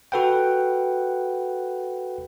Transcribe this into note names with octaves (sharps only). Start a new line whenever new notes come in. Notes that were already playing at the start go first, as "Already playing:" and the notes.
F#4 A4 B4 F#5 G5